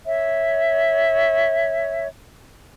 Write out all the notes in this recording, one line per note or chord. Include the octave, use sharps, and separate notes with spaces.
C#5 E5